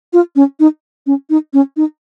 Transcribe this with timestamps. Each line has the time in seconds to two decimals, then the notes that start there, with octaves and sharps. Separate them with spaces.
0.13 F4
0.36 C#4
0.60 D#4
1.07 C#4
1.30 D#4
1.53 C#4
1.77 D#4